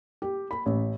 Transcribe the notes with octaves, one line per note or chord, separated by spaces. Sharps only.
G4
B5
A1